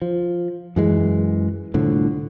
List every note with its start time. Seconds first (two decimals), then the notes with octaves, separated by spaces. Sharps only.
0.02 F3
0.76 F#2 E3 G#3
1.74 C2 A2 D3 F3